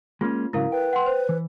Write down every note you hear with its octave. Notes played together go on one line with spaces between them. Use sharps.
G#3 A#3 C#4 F4
G#2 C#3 F#3 E4 A#4 F5
B4 G5
F#5 C6
C5
E3